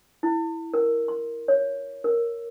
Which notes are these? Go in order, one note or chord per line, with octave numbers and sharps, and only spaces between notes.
E4
A#4
C6
C#5
A#4